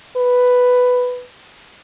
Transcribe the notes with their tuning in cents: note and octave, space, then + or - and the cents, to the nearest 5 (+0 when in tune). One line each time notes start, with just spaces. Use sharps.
B4 +5